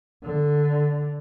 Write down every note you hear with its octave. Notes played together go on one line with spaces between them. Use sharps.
D3